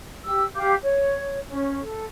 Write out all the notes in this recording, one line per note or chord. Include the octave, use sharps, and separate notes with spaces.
G4 E6
G4 F5 D6 G6
C#5
C#4
A4